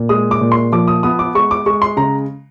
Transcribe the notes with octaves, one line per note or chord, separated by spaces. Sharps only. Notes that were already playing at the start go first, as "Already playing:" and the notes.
Already playing: A#2
G#3 D#6
D6
A#2
C6
F3 D6
D#6
B3 D#6
D6
G#3 C#6
D6
G#3 C#6
C6
C#3 A#5